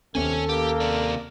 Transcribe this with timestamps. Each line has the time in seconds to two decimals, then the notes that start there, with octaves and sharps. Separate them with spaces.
0.15 D#2 C3 B3 C#4 A4 C#5 G#5
0.49 A#3 G4
0.80 C3 D5